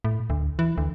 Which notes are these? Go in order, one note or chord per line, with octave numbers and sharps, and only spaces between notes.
A2
D2
E3
D2